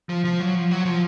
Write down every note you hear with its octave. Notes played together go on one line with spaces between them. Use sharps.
F3
F3
F#3
F3
F#3
F3